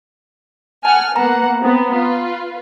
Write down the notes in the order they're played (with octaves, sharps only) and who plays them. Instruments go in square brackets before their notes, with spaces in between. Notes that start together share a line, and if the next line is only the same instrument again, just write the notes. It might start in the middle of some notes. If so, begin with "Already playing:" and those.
[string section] F#5 G#5 F6 [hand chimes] A5
[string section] A#3 B3 F#5 [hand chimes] A#5
[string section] B3 C4
F4 B4